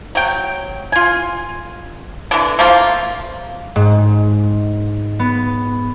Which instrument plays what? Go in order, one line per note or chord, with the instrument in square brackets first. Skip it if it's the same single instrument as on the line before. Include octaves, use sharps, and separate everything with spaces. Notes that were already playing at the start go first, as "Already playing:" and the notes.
[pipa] F#3 G5
F4 G#5
D3 E3
F3 A3 A#3 F4
[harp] G#2
B3